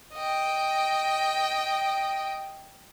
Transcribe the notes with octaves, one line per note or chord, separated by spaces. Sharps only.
D#5 G5